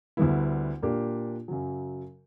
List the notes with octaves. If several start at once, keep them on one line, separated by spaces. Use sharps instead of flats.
D2 D3 G3 B3 E4
A#2 A#3 D4 G4
F#2 C#3 F#3